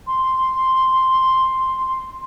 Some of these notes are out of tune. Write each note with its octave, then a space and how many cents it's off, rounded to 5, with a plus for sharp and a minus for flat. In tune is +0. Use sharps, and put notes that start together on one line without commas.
C6 +0